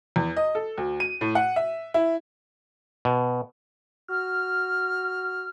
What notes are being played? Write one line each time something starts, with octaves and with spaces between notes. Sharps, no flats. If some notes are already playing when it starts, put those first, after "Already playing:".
E2
D#5
A4
D2
D#7
A2
F#5
E5
E4
B2
F#4 F6